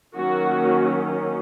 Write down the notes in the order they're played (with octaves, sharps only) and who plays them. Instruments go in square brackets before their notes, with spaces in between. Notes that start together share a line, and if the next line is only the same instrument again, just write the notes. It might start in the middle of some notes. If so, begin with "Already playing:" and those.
[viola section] D#3 F#3 A#3 C#4 F#4